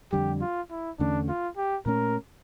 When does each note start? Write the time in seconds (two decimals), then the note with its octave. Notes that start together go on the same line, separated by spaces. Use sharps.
0.12 F2 D3 G3 G4
0.41 F4
0.71 E4
0.99 E2 D3 A3 C#4 D4
1.28 F4
1.57 G4
1.86 A#2 A3 C#4 A#4